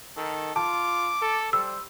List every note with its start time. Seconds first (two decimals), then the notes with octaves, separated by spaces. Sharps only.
0.17 D#3 A4
0.56 F4 A5 D6
1.22 A4
1.53 G3 C5 E6